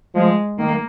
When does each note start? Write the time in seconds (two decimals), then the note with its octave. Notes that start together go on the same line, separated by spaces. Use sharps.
0.15 F3 G#3
0.58 D#3 A#3